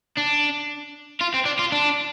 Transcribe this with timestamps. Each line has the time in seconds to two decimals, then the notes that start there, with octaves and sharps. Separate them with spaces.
0.17 D4
1.21 F4
1.34 C4
1.45 D4
1.59 F4
1.72 D4